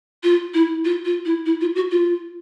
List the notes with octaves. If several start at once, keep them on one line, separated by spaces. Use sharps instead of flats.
F4
E4
F4
F4
E4
E4
F4
F#4
F4